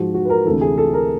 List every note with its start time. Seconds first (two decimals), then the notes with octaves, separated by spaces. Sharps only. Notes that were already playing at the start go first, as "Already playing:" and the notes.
Already playing: G#2 F3 F#4
0.14 F#4
0.25 B4
0.30 A#4
0.45 D2 C3 E3 A4
0.61 G#4
0.78 A4
0.93 A#4